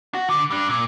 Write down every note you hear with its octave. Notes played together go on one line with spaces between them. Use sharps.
F#4
D3
G3 D4
A#2